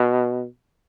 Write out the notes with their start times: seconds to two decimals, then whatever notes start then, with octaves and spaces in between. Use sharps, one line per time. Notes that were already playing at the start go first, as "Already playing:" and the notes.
Already playing: B2